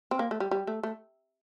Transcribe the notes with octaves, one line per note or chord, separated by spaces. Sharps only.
C4
A#3
A3
G3
G3
A3
A3